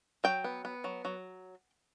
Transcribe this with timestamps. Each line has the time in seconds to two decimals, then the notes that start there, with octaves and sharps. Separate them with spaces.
0.24 F#3 G5
0.44 B3
0.65 B3
0.84 F#3
1.05 F#3